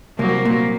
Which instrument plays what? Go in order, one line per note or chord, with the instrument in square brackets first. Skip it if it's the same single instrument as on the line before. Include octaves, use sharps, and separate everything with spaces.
[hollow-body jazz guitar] C2 [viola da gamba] F#3 A#3
[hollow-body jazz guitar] A#2